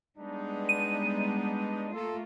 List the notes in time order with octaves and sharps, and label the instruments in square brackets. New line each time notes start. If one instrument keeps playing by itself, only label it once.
[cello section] G3 G#3 B3 [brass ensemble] D4 D#4
[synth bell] D#7
[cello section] A3 A#3 F4 [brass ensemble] A4